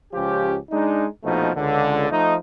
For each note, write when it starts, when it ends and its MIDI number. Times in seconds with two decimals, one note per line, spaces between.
0.13 0.55 37
0.13 0.55 53
0.13 0.55 61
0.13 0.55 67
0.70 1.05 56
0.70 1.05 62
0.70 1.05 63
1.23 1.50 34
1.23 1.50 47
1.23 1.50 53
1.23 1.50 57
1.23 1.50 63
1.56 2.07 37
1.56 2.07 50
2.10 2.34 53
2.10 2.34 57
2.10 2.34 63